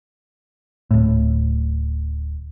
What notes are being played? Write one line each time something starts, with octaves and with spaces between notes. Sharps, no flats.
D1 A2